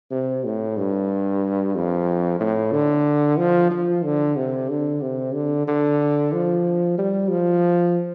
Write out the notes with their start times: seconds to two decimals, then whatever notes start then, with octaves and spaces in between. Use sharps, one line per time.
0.11 C3
0.45 A2
0.77 G2
1.75 F2
2.40 A2
2.72 D3
3.38 F3
3.71 F3
4.04 D3
4.36 C3
4.70 D3
5.02 C3
5.35 D3
5.67 D3
6.33 F3
6.98 G3
7.30 F3